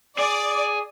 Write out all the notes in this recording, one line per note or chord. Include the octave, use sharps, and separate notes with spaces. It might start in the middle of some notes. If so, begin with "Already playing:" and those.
G#4 D5